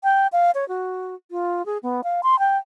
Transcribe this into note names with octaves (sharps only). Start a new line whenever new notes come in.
G5
F5
C#5
F#4
F4
G#4
B3
F5
C6
G5